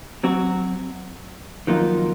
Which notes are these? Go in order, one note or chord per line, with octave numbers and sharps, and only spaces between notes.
F#3 C4 F#4
F2 D#3 F#3 A#3 F4